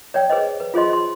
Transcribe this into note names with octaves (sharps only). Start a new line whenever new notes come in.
C#5 D5 G5
G#4 B4 C5 D#5
B4
F4 G#4 C5 D#5 C6
C5 C6